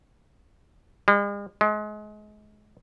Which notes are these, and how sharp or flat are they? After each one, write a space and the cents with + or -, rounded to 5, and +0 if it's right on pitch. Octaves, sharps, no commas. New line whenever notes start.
G#3 -45
G#3 +30